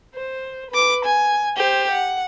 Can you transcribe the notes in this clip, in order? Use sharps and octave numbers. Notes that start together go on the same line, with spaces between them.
C5
B4 D6
G#5
G4 C5
F#5